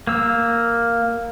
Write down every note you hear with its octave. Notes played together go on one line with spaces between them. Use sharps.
A#3 E6